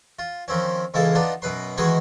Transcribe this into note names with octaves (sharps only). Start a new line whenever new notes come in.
F4
D#3 F3 C4 C#4
C#2 G#2 E3 G#3 A4 F5
B3 D4 D#4 F4
F#2 B2 B4 C6
D#3 E3 G#3 F#4 G#4 B4